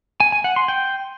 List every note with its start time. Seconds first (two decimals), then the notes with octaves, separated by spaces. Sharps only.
0.20 G#5
0.32 G#5
0.44 F#5
0.56 C6
0.68 G5